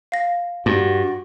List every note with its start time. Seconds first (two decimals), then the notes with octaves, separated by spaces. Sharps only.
0.12 F5 A#6
0.66 G2 F#4